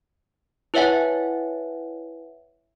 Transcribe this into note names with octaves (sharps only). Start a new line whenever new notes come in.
E4 B4 C#5 E5 F#5 G#5